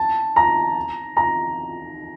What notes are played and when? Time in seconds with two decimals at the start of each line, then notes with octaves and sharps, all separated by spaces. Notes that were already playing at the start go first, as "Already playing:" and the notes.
Already playing: A5
0.36 A#5
1.17 A#5